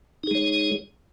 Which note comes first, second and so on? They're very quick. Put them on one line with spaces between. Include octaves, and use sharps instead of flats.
D#4 G#4 G#3 C#5